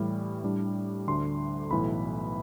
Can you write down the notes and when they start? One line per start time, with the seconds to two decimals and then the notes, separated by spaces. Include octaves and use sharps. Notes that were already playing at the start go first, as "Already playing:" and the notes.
Already playing: A2 E3 G3
0.44 A2 G3 D4
1.07 D2 D3 A3 D4 C6
1.71 B1 A2 E3 B5